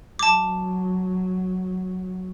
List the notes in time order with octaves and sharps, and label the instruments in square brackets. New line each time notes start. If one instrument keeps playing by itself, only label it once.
[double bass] F#3 [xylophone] A5 D6